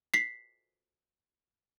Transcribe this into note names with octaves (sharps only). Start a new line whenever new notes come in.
B6 C7